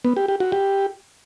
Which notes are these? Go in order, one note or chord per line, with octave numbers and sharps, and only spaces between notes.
B3
G4
G4
F#4
G4